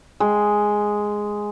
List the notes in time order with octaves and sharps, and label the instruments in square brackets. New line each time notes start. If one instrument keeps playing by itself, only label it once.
[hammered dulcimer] G#3